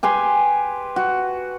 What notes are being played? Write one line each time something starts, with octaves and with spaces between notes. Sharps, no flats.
G4 B4 G#5 C6
F#4